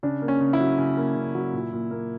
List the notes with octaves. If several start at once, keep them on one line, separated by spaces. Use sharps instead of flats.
C#3 D4
A#3
C#4
C#3
E4
F#3
C#3
A#3
C#3
F#3
A#2
A#2
A#3